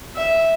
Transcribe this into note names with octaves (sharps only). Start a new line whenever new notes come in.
E5